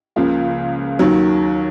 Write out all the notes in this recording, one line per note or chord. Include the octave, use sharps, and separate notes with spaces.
C#2 C#3 F3 A#3 F4
D#2 D#3 F#3